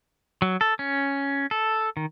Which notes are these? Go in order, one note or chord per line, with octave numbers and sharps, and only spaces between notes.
F#3
A4
C#4
A4
D#3